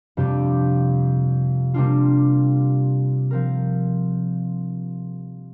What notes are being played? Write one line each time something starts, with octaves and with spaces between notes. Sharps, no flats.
F2 C3 G3 D4 G4
C3 G3 A#3 D4 F4
F3 C4 A#4